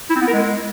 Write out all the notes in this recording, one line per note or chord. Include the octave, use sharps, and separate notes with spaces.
E4
C4
B3
A#4
G#3